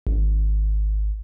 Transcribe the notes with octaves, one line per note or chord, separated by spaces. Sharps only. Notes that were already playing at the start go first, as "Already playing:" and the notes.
G#1